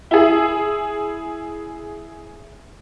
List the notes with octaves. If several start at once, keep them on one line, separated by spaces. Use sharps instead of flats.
E4 G#4